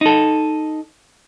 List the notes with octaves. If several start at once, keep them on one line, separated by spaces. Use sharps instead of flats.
D#4 A4